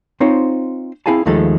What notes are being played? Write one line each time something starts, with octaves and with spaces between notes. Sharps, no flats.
C4 D#4 F4 C5 C#5
C4 E4 G#4 F5 G#5 A5
D#2 D#3 F3 G#3 A3 A4